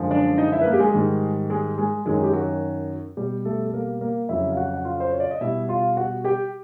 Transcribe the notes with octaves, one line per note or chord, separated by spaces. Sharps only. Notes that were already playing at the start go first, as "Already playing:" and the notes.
Already playing: F#2 D3 F3 G#3
D4 D5
D#4 D#5
E4 E5
B4
A#3 A#4
G4
G#3 G#4
G#2 D#3 G3
G#3 G#4
G#3 G#4
F#2 D#3 F#3 G#3 G#4
G4
F#3 F#4
B2 G3 G4
A3 A4
A4
A#3 A#4
A#3 A#4
F2 C#3 F#3 E4 E5
F5
F#4 F#5
F#5
F4 F5
C5
C#5
D5
D#5
B2 G3 E4 E5
F4 F5
F#4 F#5
G4 G5